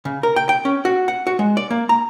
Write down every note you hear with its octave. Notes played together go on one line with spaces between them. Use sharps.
C#3
A#4
G5
G5
C#4
F#4
F#5
F#4
G#3
D5
A#3
A#5